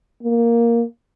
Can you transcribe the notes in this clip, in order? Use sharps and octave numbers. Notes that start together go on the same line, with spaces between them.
A#3